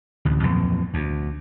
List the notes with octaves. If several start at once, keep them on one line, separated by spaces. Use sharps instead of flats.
A1 D2
B1 F2 A#2 E3
D2